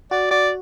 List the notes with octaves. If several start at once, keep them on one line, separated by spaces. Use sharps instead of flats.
F#4 D5
F#4 D5